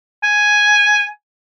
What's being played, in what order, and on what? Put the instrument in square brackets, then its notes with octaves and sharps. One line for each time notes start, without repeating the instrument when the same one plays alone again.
[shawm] G#5